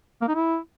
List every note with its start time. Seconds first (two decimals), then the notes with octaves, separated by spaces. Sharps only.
0.21 A#3
0.28 D#4
0.35 E4